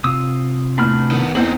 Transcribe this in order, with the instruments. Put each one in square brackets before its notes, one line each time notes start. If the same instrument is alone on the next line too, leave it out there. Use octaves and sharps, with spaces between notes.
[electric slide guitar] C3 F4 [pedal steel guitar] D#6 E6
[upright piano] E2 A2 [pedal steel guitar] D4 B5 F6
[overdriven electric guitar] D#3 B3
[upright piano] E2 F#7 [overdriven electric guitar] C4 D#4 [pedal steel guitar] G#4 A4 C5